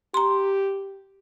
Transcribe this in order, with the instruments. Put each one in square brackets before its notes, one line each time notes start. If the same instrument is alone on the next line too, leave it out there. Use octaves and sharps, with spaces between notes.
[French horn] G4 [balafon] A#5 C6